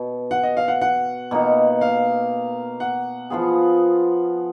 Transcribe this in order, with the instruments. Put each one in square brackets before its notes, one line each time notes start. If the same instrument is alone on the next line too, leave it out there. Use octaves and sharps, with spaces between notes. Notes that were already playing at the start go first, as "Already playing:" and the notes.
Already playing: [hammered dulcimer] B2
[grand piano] F#5
D#5
F5
F#5
F#5
[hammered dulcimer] B2 A#3 D#4
[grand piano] F5
F#5
[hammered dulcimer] F3 B3 F4 G#4